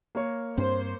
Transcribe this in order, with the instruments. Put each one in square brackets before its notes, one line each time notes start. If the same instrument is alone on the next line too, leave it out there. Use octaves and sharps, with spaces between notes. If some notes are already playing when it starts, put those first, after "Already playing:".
[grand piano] A#3 A#4 C#5
[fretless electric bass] G2 C4 [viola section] C5